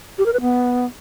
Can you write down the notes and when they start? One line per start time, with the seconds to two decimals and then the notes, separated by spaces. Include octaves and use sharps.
0.18 G4
0.26 A#4
0.33 B4
0.41 B3